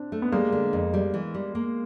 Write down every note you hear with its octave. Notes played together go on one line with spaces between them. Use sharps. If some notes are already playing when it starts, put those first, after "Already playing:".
Already playing: C4 D4
A3
B3
G3 G#3 A#3
D3
F2
G3
E3
G3
A#3